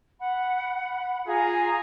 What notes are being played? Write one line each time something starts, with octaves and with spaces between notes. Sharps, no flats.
F#5 B5
F4 G#4 F5 G#5 A#5